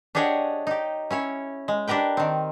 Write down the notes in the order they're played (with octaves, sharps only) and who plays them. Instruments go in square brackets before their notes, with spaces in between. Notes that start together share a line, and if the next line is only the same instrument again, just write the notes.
[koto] D4 G4 G#4 C#5 D#5 F#5
D#4 G4
C#4 E4 C#5
G#3
D4 G4 A#4 B4 G5
D#3 C4